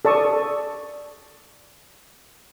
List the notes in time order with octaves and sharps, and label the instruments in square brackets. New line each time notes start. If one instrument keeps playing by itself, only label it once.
[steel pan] A4 D5 A5 C#6 D#6